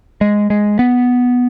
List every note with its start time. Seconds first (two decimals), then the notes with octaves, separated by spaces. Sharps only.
0.21 G#3
0.50 G#3
0.79 B3